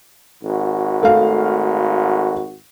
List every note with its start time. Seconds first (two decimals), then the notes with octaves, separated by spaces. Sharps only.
0.42 G#1 F#4
1.03 A3 F5